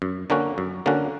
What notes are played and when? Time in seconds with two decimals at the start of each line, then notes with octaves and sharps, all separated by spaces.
0.02 F#2
0.30 D3 A#3 C#4 F#4
0.58 F#2
0.86 D3 A#3 C#4 F#4